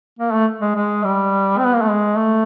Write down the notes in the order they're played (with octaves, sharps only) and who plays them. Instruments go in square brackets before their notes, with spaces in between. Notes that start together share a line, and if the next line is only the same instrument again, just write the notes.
[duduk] A#3
A3
G#3
G#3
G3
C4
B3
A#3
A3
G#3
A3